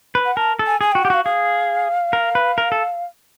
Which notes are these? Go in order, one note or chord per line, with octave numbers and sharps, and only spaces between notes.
B4
F#5
A#4 A5
A4
G#5
G#4 G#5
F#4 G5
G4 F#5
F#4 F5
G#4 F5
A#4
B4
A#4
A4